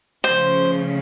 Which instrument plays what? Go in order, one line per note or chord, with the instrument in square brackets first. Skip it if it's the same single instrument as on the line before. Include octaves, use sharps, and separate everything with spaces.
[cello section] C#3 F3 A3 C#4 [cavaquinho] C5